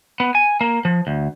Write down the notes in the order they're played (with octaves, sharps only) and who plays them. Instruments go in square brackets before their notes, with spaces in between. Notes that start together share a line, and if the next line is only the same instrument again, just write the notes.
[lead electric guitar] B3
G#5
A#3
F3
D2